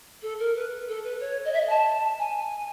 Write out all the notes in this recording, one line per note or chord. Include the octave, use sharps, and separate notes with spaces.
A4
A#4
B4
A4
B4
C#5
D#5
E5
D#5
A5
G#5